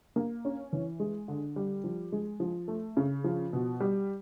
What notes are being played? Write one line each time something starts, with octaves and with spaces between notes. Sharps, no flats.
A#3
C#4
E3
G#3
D3
G3
F3
G#3
F3
A3
C#3
F3
B2
G3